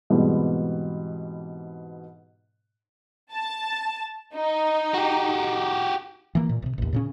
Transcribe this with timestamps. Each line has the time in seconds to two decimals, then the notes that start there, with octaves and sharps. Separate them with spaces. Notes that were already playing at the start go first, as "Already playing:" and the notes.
0.10 G#2 B2 E3 G3 B3 C4
3.33 A5
4.35 D#4
4.94 F#4 G4
6.35 E3 A#3
6.49 A#2
6.62 A1 C3
6.78 A1 D#2
6.93 A#2 C#3 C#4